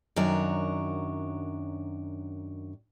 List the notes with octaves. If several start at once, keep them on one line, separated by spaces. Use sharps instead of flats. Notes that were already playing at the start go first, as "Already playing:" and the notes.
F#2 D#3 D4 F#4 C#5